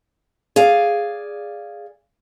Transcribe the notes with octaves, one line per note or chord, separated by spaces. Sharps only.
G#4 D5 F5